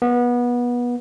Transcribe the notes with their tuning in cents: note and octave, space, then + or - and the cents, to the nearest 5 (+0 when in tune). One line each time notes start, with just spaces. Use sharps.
B3 -25